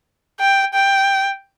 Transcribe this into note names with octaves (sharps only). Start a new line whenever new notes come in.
G5
G5